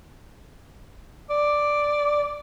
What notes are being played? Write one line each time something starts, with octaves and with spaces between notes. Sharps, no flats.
D5